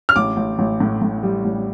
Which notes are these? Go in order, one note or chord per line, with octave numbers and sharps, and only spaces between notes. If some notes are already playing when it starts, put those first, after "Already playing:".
F6
A1 D6
A1
A1
A2
A2
G3
A1